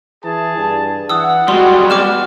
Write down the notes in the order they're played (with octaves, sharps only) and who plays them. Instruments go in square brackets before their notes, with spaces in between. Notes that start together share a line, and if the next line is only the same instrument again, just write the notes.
[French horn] E3 [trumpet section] G#4 A5
[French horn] G2
[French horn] E3 [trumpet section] F#5 [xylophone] D#6 E6
[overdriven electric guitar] G3 G#3 [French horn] F#4 [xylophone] C6
[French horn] B3 [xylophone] D6 F6 E7